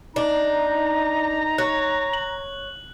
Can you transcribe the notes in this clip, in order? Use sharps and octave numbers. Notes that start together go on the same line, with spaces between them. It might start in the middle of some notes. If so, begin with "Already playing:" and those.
D4 D#4 A#5
C#5 F#6
F#7